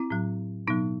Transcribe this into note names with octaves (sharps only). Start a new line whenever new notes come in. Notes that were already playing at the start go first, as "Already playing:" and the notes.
Already playing: C4 E4
A2 F#3
B2 F#3 B3 D#4